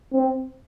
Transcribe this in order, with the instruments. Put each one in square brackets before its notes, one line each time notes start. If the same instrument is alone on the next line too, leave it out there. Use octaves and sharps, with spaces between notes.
[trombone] C4